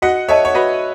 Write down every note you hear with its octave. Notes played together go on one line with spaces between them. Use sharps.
F#4 D#5 F#5
A4 C#5 D#5 E5 A5
C#5
F#4 B4 D#5